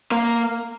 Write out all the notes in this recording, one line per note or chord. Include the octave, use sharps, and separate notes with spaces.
A#3